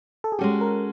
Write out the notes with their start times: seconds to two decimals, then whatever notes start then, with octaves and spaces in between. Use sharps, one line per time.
0.24 A4
0.32 G#4
0.39 G#3 C#4 F#4 G4 A4
0.61 A#4